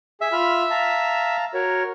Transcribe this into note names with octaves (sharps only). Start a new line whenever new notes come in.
G#4 E5
F4 B5 F6
F5 A5 A#5
F#4 A#4 C#5